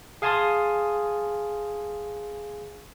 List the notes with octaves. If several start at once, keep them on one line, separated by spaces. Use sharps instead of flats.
G#4 F5 G#5 A5 C6 D#6